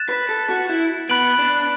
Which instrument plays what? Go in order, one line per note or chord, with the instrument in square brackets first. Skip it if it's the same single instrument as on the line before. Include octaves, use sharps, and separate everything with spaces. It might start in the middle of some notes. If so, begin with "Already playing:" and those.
Already playing: [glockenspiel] F#6 A6 E7
[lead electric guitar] B4
A4
F#4
E4
[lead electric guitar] B3 [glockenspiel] B5 F#6 D7 F#7
[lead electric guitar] D4